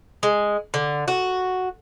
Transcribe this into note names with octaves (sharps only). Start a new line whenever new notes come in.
G#3
D3
F#4